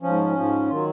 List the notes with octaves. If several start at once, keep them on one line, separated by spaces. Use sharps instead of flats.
G#2 F3 C#4
G#2 F3
D#3 F#3 F4